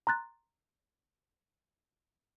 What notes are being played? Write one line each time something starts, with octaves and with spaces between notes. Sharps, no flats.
A#5 C6 F#6 A6